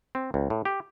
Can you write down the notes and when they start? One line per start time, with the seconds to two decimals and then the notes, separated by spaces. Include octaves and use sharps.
0.15 C4
0.34 C#2
0.50 A2
0.65 G4